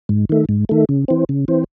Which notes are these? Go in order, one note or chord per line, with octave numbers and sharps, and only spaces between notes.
G#2
D#3 A3
G#2
D#3 A3
C#3
E3 C4
C#3
E3 C4